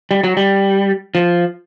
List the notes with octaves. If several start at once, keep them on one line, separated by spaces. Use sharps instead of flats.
G3
F#3
G3
F3